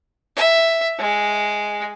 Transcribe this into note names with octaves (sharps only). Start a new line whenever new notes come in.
E5
G#3